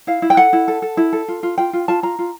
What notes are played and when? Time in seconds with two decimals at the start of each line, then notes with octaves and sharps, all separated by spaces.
0.07 E4 F5
0.22 E4
0.30 G5
0.37 A4 F#5
0.53 E4
0.68 A4
0.82 A4
0.97 E4
1.13 A4
1.28 F4
1.43 F4
1.58 F4 G5
1.73 F4
1.88 F4 A5
2.03 F4 A#5
2.19 F4